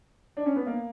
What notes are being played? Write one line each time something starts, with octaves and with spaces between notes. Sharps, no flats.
D4
C#4
B3
A#3